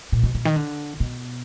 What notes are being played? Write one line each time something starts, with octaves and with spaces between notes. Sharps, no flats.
A#2
B2
B2
D#3
D3
B2